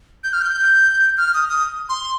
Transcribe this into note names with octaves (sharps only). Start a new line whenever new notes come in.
G6
F6
G6
F6
D#6
D#6
C6